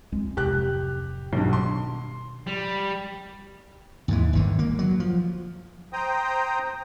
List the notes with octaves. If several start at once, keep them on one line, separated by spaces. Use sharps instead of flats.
C#2 G#3 C4
D1 F2 C3 G4 F#6
B1 G2 B2 D#3
C6
G3
D#2 G#2 E3
G1 D3 D#3
A#3
F#3
F3
C5 G5 A#5 D#6